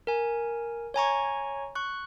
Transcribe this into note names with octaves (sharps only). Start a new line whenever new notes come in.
A#4 G#5
C#5 G#5 A#5 C#6
C#6 F#6